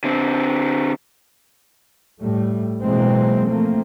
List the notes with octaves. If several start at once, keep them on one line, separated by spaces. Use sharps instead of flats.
D3 C4
A2 G3 A3
B2 E3 F#3 G#3 A#3 C4
F3 A3 A#3 C4